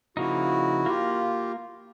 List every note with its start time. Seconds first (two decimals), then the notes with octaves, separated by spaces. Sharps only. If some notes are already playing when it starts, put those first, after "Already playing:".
0.17 C#3 F3 A#3 D#4 E4 F#4
0.86 A#3 F4 G4